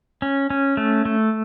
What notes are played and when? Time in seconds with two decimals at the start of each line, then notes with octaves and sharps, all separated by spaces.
0.22 C#4
0.50 C#4
0.77 A3
1.05 A3